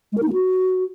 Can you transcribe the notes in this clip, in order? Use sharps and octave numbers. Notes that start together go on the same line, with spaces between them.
G#3
A#4
D#4
A#3
F#4